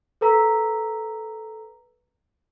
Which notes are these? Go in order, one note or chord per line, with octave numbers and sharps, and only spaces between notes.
A4 B4 A#5 E6 B6